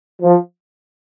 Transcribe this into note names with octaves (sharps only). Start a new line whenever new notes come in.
F3